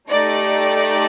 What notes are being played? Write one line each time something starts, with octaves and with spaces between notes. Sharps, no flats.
A3 D#4 G4 D5